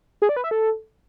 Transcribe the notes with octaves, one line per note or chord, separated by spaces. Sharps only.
G#4
D5
B4
E5
A4